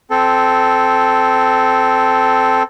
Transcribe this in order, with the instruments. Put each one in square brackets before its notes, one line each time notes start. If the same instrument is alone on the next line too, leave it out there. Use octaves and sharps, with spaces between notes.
[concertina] C4 A4